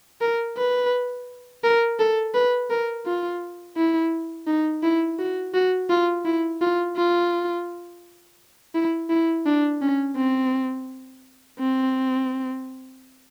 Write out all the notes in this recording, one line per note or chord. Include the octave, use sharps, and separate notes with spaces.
A#4
B4
A#4
A4
B4
A#4
F4
E4
D#4
E4
F#4
F#4
F4
E4
F4
F4
E4
E4
D4
C#4
C4
C4